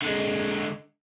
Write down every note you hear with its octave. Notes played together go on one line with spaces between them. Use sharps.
D3 G#3